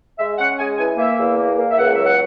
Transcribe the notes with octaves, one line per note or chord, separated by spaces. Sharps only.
G#3 E5
C#4 F#5
G#3 G#5
E3 G#5
A#3 E5
E2
A#3
A#3
E5
C#2 F#5
F#3 E5
F#5